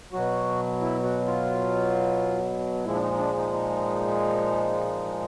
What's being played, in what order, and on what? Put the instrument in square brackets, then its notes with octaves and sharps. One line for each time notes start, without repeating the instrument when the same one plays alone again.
[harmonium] B2 F#3 F#4
E4
F#4
F4
A#2 F3 G#3 E4
D4
D#4
D#4
D4
D#4
D#4